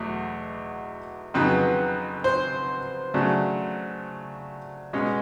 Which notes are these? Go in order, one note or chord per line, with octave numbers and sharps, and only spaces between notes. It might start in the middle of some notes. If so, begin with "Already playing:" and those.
Already playing: E2 B2 F#3 A3
F2 C#3 F#3 B3 D#4 B4
C5
C#3 F#3 A3 D4
B2 G#3 C#4